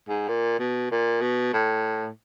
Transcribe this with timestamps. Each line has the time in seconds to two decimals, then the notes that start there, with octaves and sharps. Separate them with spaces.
0.09 G#2
0.28 A#2
0.59 B2
0.91 A#2
1.21 B2
1.53 A2